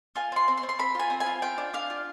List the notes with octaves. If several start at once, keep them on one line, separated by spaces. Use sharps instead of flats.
F4 G#5
C4 C6
C4
C6
C4
C6
C4 B5
F4 G#5
C4
G#5
F4
F4 G5
D4
D4 F5
F4